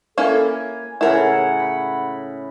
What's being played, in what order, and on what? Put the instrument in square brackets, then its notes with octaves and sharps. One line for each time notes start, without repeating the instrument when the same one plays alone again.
[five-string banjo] A#3 C#4 E4 [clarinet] A4
[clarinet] G#5
[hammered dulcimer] A2 C#3 [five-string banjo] E4 A#4 [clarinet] F#5
[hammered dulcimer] B5